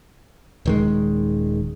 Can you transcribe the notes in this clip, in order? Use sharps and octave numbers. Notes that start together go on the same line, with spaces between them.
D#1 D#3 G#3